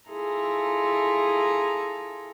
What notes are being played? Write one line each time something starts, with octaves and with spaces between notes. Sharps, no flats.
E4 F4 G#4 A4 A#5